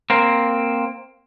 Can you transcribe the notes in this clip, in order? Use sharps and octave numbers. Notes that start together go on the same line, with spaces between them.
A#3 C4